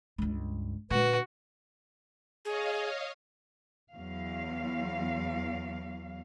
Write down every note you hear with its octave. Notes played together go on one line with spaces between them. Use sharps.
C#2 G2
A#2 D3 F#4 B4
G#4 C#5 D#5 F5
E2 F#3 F5